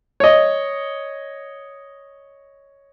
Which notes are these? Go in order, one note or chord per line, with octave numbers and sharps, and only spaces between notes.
C#5 D#5